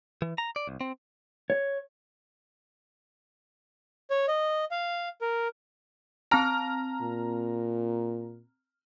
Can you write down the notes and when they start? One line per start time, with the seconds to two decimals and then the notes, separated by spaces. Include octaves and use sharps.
0.22 E3
0.38 A#5
0.56 D5
0.67 C2
0.81 C4
1.50 C#5
4.10 C#5
4.28 D#5
4.71 F5
5.21 A#4
6.31 C4 A5 A#5 F6
7.01 A#2